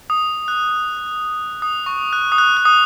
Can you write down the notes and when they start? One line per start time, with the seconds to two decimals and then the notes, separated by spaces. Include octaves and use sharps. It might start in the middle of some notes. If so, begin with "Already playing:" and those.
0.10 D#6
0.48 F#6
1.62 D#6
1.86 C#6
2.13 F#6
2.32 D#6
2.38 F#6
2.57 F#6
2.65 D#6